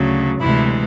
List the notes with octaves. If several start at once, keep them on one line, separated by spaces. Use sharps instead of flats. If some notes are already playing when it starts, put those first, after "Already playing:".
Already playing: D2 C#3 F#3
D2 C3 E3 G#3 E4